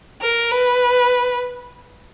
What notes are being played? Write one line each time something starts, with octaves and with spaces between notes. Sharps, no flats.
A#4
B4